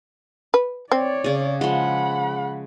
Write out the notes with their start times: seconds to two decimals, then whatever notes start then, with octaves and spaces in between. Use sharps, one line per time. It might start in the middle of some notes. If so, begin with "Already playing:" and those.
0.54 B4
0.92 C4 C#5 D5
1.24 C#3 G#4
1.61 F3 G#3 F#5 B5